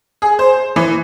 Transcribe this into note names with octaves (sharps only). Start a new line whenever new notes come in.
G#4
C5
E3